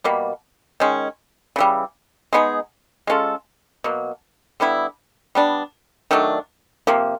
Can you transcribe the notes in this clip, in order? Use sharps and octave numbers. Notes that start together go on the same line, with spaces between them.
B2 G3 A#3
D#3 G#3 C#4
C#3 E3 G3
G#3 B3 D#4 G#4
G#3 C#4 F4 A4
B2 F#3 A#3
D3 G3 B3 E4
G3 B3 D4
D#3 F#3 A3 D4
C3 F3 A#3